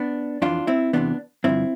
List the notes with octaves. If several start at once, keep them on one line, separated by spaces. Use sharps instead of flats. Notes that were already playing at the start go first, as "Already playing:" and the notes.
Already playing: B3 D4
F2 E3 D4 F4
C4 E4
E2 C3 E3 B3 D4
G2 D3 F3 C4 E4